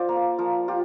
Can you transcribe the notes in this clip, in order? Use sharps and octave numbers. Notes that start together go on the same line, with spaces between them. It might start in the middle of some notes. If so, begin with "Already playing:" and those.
Already playing: F4 C5 D5
A#3
A#4
F3 A#4
F4 G4